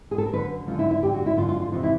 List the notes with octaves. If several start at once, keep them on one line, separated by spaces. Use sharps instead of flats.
G#4
A4
A#4
F#2 D3 B4
F#2 D3 F4
E4
E4
F#2 D3 G4
F#4
E4
F#2 D3 F4
F4
F4
F2 C3 E3 F4
E4